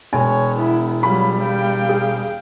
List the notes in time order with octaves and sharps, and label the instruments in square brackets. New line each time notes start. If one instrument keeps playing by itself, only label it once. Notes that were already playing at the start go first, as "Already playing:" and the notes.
[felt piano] E1 [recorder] C#5 [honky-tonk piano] G#5
[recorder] B3 [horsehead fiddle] E4
[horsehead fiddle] F#3 F4 [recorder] G3 [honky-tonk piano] B5
[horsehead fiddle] F5 G5
[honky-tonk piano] G#4